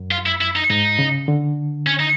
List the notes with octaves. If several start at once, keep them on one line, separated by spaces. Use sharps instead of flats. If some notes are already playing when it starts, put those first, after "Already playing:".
Already playing: F#2
F4
E4
E4
D#4
G#2 D#4
C#3
D3
C#4
D#4